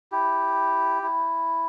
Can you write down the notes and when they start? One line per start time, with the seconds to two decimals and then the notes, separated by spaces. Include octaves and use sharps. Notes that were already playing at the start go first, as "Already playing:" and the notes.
0.12 E4 G4
1.03 E4